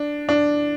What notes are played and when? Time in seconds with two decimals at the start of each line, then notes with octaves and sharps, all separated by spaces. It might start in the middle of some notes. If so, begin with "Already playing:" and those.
Already playing: D4
0.29 D4